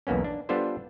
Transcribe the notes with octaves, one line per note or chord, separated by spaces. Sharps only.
B1 E2 A#3 B3 C#4
D4
G3 B3 D4 F4 A4 C5